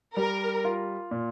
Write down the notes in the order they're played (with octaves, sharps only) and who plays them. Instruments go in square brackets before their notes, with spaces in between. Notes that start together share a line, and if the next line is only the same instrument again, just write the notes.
[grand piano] G3 [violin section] A#4
[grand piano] F4
A#2